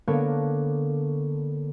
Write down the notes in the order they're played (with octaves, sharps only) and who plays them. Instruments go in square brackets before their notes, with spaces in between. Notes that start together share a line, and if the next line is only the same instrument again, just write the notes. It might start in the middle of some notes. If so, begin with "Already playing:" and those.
[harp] D3 A#3 B3 D4 C#5 G#6